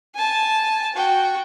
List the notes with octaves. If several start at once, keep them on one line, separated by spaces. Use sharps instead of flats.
G#5 A5
F#4 G5